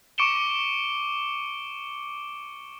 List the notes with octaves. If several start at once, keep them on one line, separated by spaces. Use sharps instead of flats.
C#6 D6 C#7 D7 E7 G7